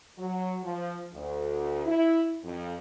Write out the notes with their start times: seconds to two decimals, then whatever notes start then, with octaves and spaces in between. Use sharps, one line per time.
0.18 F#3
0.63 F3
1.13 D2
1.86 E4
2.44 F2